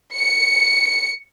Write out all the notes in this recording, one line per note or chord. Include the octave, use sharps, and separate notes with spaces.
C#7